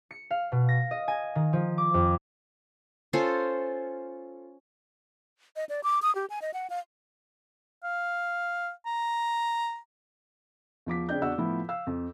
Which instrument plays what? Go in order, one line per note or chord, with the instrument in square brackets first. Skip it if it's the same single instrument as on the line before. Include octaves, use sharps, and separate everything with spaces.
[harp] C#7
F5
B2
A#6
D#5
G#5
D#3
F3
D6
F2
[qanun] C#4 F4 A4 C5
[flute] D#5
D5
D6
D#6
G4
G#5
D#5
F#5
F5
[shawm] F5
A#5
[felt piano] E2 F3 D6 B6
C#3 C4 D4 G6
E2 D4 F#4 F#5 E6
A2 F3 B3 E4 F4
F5 E6
F2